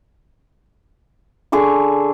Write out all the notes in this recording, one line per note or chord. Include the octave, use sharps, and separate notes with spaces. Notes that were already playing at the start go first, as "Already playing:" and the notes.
D3 G#4 C#6 D6